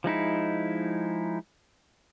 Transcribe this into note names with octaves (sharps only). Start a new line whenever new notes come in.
F3 G#3 D#4 E4